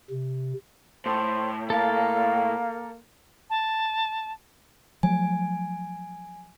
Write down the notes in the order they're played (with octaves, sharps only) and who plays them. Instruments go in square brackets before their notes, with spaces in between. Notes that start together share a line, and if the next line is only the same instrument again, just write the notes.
[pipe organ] C3
[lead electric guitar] A2 [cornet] C5 [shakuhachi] A5
[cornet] A#3 [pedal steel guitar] A4 A#4 A5 [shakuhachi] F5
[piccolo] A5
[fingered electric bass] F3 F#3 A3 [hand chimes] G#5